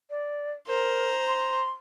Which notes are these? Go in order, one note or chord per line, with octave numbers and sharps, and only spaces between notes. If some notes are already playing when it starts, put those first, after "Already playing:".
D5
A#4 C5 A#5
C6